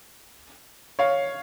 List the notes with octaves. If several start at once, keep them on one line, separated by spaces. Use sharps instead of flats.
C#5 F5